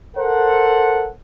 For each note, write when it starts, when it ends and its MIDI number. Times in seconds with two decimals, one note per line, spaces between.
0.17 1.09 69
0.17 1.09 70
0.17 1.09 72
0.17 1.09 78